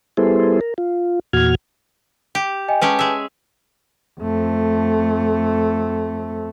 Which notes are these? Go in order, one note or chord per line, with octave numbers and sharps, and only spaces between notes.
G3 B3 E4 G#4 A4 C5
A#4
F4
E2 A#2 F#4 F6 G#6
G4
D#5 G5 G#5
G#3 C#4 G4 B4 G#5 A5
G#3 E5
F2 A3